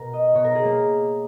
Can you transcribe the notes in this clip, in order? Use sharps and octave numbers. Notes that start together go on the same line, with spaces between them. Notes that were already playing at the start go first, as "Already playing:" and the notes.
Already playing: B2 A#4
D#5
B2 C#5
A#4
G#4
A#3